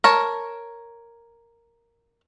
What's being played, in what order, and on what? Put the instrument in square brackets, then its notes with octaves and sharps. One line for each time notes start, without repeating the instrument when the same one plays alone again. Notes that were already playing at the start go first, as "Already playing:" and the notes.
[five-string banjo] A#4 C#5 A5